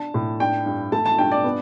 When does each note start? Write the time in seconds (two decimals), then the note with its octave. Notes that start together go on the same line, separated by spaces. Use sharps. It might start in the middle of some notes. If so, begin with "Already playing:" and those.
Already playing: D4 A5
0.14 A2
0.40 D4 G5
0.66 G2
0.92 A3 A5
1.06 A5
1.18 G2 G5
1.32 D5
1.44 B3